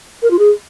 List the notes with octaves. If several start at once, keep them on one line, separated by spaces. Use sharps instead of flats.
A#4
F4
G#4